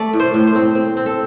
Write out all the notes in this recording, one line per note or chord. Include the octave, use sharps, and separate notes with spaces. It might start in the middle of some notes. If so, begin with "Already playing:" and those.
Already playing: A3 D5
A2
C5
A2
C5
C4
C4
C4
A4